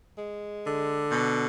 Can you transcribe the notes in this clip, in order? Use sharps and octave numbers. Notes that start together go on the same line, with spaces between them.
G#3
D3
B2